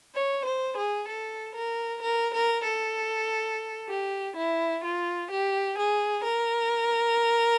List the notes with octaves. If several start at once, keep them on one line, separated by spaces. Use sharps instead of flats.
C#5
C5
G#4
A4
A#4
A#4
A#4
A4
G4
E4
F4
G4
G#4
A#4